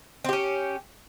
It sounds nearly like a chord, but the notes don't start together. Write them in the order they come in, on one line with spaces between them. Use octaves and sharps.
C4 G4 C#4